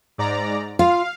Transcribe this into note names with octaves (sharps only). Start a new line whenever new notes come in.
G#2 D5 A#5
F4 F5